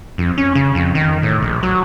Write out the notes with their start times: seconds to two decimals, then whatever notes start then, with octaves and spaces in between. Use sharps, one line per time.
0.18 F2
0.38 C#4
0.55 C#3
0.75 F2
0.95 D#3
1.23 A2
1.42 A#1
1.63 F#3